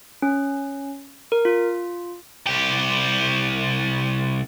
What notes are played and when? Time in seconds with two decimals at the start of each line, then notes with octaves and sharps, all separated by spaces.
0.22 C#4
1.32 A#4
1.45 F4
2.47 C2 G4